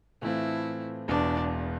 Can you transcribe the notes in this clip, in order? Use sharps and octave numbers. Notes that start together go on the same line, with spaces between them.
A2 E3 A3 C4 E4 F4
E1 E2 B2 B3 D4